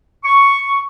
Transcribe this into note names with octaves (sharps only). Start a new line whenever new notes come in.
C#6